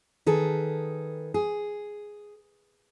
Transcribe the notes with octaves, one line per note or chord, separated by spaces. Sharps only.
D#3 G#4 A4 B4
G#4